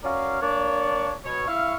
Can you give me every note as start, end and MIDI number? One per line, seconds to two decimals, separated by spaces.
0.04 0.39 61
0.04 0.39 66
0.04 0.39 70
0.04 0.39 73
0.04 0.39 74
0.04 0.39 77
0.41 1.12 58
0.41 1.12 62
0.41 1.12 73
0.41 1.12 74
1.25 1.43 47
1.25 1.43 73
1.48 1.75 64
1.48 1.75 76
1.48 1.75 77
1.48 1.75 85